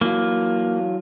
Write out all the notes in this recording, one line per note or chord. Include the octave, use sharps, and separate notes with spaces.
E3 F#3 A#3 F4